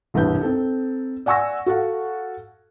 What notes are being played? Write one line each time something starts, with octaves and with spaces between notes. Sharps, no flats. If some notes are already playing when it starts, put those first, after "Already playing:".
E1 C2 G2 B4 G6
C4 D#4 A4
D5 F#5 G#5 C#6 E6 A#6
F#4 A4 F5 F#5